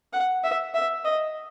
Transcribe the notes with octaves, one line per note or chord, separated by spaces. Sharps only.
F#5
E5
E5
D#5